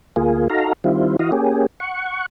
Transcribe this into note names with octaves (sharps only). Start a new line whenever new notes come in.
D2 A#3 F4 G#4
D#4 F#4 A4 F5 A#5
D#3 G3 C4 E4 F4
E3 E4 F#4 D#5 F5
A#3 C#4 G4 G#4
F#5 C#6